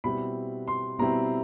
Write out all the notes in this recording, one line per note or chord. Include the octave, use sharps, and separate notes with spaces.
B2 G3 C4 E4 B5
C6
B2 G3 C4 E4 A#5